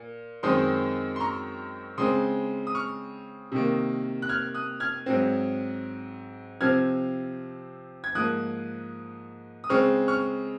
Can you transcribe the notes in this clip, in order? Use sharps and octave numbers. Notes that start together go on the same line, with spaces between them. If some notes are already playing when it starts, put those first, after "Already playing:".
Already playing: A#2
F#2 D#3 G#3 C4 C6 D#6
C6
A#5 C#6
C#3 G#3 C4 C6 D#6
D#6
C#6 F6
C3 D#3 A#3
F#6
F6 G#6
D#6 F#6
F6 G#6
G#2 F#3 C4
C3 F3 C4 F6 G#6
G#6
G#2 F3 A#3 D#6 F#6
D#6
C#3 G#3 C4 C#6 F6
C#6 F6